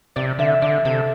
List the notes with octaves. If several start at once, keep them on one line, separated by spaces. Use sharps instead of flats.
C3 D5
D3 E5
D3 D5
C3 A4